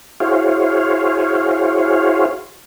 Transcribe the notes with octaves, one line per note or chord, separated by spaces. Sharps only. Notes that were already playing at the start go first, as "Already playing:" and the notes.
E4 F#4 G#4 C5 C#5 F5